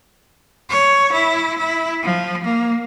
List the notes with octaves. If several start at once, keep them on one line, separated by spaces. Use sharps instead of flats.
C#5
E4
E4
F3
A#3